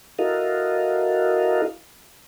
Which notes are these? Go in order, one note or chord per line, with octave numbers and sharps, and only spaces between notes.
E4 F#4 A4 A#4 D#5 F5